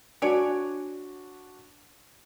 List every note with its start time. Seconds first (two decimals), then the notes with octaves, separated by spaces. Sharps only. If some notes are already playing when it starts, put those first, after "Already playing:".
0.22 D4 F#4 C#5 D5 G#5